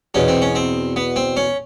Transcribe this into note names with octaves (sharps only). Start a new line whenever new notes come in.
E2 B2 C#4
C4
C#4
C4
B3
C4
C#4